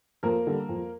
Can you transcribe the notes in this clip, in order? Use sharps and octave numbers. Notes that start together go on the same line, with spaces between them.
F2 A#3 A#4
D3 G3
F2